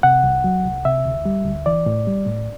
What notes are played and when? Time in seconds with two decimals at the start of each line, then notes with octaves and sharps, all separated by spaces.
0.03 C3 F#5
0.24 C2
0.44 F#3
0.65 C2
0.85 C3 E5
1.05 D2
1.25 G3
1.45 D2
1.66 E3 D5
1.86 A2
2.07 G3
2.27 A2